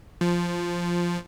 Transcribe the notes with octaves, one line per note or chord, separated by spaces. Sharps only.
F3